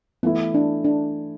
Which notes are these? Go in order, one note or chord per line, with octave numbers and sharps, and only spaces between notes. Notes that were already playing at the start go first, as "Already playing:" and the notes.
E3 A3 B3 E4
D4
D4